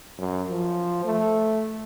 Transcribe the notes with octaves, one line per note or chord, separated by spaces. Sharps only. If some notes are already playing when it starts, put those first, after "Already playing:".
F#2
F3
A3